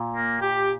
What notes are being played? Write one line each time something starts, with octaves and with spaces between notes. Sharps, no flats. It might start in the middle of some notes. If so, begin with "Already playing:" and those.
Already playing: A#2
A#3
G4